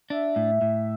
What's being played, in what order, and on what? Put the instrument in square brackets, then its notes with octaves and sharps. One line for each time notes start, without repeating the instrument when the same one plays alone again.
[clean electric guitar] D4 [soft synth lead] E5
[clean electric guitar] A2
A2